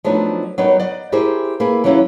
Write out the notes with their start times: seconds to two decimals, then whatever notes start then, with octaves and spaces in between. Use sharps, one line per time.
0.04 F3 F#3 A3 B3 D4 D#4
0.58 F#3 G3 B3 D#4 A#4 C#5
0.80 D5 D#5 F#5
1.12 E4 G4 G#4 A#4 C5
1.60 A#3 E4 G#4 B4
1.84 E3 F#3 G3 C#4 E4 F4